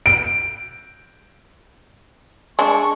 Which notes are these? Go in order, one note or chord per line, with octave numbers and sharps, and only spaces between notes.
D7
G#3 D4 C#6